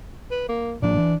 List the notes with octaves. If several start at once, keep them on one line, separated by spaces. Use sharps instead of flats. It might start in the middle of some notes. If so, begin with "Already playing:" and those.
B4
A#3
A2 F3 A#3 D4
E3